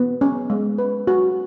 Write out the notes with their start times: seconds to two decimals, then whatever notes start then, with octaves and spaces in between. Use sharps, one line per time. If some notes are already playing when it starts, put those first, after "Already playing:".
Already playing: B3
0.21 C#4
0.50 G#3
0.78 B4
1.07 F#4